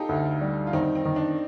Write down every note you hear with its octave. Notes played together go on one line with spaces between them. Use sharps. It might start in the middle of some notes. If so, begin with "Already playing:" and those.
Already playing: D#4 F4 G4 A4
D2
G3
F4
D#3 C4 D#4
C4
D#3
D4